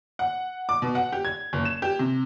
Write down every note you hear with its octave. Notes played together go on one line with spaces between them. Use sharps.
F#5
D6
B2
F#5
G4
G#6
F#1
E7
G4
C3